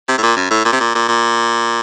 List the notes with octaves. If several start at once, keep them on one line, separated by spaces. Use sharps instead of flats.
C3
A2
A#2
F#2
A2
A#2
C3
A#2
A#2
A#2